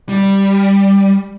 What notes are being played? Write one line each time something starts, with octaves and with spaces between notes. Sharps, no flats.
G3